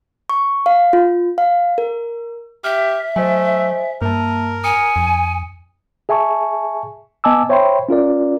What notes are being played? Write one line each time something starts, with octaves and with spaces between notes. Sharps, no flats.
C#6
F5
F4
F5
A#4
G4 E5 F6
F#3 A3 C5 D#5 G#5
G2 A#3 A#4 A5
G#5 D#6 C#7
F2
G#4 E5 G#5 A5 C#6
B3 D#5 G#5 A5 D6 E6
C5 C#5 E5 G5 B5 C6
C#4 F4 A#4 D5